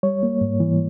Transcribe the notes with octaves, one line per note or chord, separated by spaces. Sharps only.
G3 C#5
A#3
G#2
E3